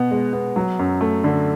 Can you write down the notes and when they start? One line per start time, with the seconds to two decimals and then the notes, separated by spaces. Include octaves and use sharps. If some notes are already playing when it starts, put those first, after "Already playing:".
Already playing: B2 B3
0.11 G#3
0.33 B3
0.56 F#3
0.79 F#2
1.01 A3
1.24 D3